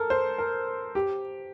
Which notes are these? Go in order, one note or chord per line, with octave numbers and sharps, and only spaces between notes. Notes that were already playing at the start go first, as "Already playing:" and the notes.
Already playing: A4 A#4
C5
A#4
G4